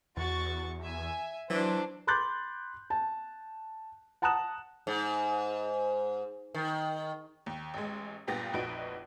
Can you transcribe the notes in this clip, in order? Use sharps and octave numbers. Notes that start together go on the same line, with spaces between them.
E2 F#4 C#6 A6
E5 G#5
E3 F#3 D4 C5
B5 C6 D6 F#6 G6 A6
A5
F#5 A5 A#5 D#6 F#6 E7
G#2
D#3
D#2
A1 G#3
G2 A#2 B3 G4 A6 A#6
F1 A#1 D#4 F#4 B4 D7